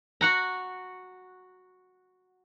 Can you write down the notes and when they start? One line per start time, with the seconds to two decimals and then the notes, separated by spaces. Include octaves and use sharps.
0.21 F#4 F#5 A#5